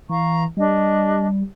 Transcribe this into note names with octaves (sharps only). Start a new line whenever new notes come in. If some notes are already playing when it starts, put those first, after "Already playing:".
E3 F5 A#5 C#6
G3 D4 D#5